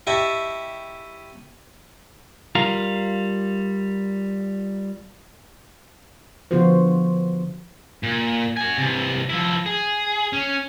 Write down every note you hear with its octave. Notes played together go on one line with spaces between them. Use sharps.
E4 G4 D#5 E5 A5 C#6
G3 F4 A#4 F5 A#5
D3 F3 B3 F4 F#4 C5
A#2
F#4 G#5
C3 E3
F3 E4
G#4
C#4